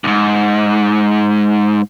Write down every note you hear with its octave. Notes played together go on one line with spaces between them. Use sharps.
D2 G#2